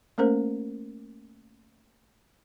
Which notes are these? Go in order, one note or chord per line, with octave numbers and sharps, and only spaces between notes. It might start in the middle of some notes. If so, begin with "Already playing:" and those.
A3 A#3 C#4 A#4 C5